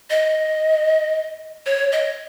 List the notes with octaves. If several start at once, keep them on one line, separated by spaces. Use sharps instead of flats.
D#5
C#5
D#5